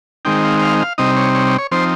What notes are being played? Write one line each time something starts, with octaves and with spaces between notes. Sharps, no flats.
D#3 G#3 C4 D#4 G5
F5
F5
F5
C3 G3 C4 D#4 D#5
C#5
C#5
C#5
C#5
F3 C4 D#4 C5